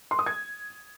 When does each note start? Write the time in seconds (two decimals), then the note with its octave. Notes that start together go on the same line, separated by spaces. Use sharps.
0.11 C6
0.19 D#6
0.26 G#6